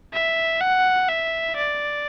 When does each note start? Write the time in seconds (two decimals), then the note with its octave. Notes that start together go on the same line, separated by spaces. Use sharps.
0.13 E5
0.61 F#5
1.09 E5
1.56 D5